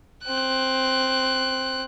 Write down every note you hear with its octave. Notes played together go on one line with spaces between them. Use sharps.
C4 F#6